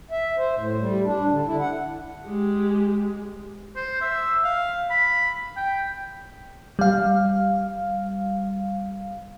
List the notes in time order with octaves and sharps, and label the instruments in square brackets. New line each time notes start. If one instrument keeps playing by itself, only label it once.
[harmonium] E5
C5
A2
G3
D4
D3
E4
F#5
[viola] G#3 G4
[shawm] C5
E5
F5
B5
G5
[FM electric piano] G3 F5